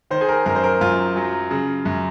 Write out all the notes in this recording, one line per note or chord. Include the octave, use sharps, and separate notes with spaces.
D#3 C5
G#4
A#4
F#2 A#4
C5
A#4
F#2 F4
F#3
C#3
F#2